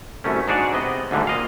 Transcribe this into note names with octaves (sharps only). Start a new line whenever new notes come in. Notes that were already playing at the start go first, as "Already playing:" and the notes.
C2 F#2 A3 C#4
G#2 D4 F#4 G#4 C#5 D5
C3 B3 D#5
D2 G#2 D3 G3
A#2 D#5 F5